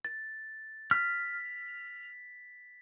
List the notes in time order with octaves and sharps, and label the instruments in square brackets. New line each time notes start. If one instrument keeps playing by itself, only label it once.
[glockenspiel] A6
[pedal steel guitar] F6 [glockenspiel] B6